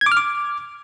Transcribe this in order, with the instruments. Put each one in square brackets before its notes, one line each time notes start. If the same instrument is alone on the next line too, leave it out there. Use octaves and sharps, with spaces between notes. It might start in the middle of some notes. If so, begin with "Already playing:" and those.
[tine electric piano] G#6
D6
F6
D6